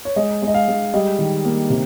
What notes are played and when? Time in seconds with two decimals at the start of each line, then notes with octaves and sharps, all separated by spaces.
0.05 C#5
0.16 G#3 D#5
0.42 G#3
0.48 D#5
0.54 F5
0.68 G#3
0.94 G3 D#5
1.19 D#3
1.45 A#3
1.70 C3